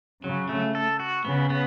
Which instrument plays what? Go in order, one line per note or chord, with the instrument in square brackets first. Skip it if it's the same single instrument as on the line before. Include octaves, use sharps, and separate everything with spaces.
[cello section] C#3 [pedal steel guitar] F#3
[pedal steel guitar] A3
A4
F#4
[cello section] C#3 [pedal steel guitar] B3
[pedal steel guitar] B3